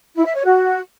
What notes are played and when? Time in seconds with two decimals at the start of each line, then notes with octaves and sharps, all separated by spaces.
0.17 E4
0.26 E5
0.35 C#5
0.45 F#4